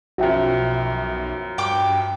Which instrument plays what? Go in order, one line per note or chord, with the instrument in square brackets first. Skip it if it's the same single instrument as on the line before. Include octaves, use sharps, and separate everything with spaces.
[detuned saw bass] B1 [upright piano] F#2 F3 [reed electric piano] F#4 E5 G5
[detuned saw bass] G2 [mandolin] G5 D6